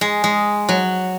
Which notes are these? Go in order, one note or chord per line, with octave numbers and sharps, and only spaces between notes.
G#3
G#3
F#3